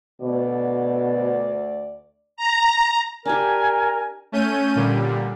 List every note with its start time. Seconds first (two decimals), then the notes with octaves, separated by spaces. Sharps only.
0.22 D2 B2 D5
2.37 A#5
3.26 D4 G4 A#4 G#5
4.32 A3 C#4 G6 D#7
4.75 A#2 D3 G3